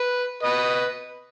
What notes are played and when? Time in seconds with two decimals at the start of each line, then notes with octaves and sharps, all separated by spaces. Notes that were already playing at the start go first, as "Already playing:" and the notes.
Already playing: B4
0.43 B4 D#5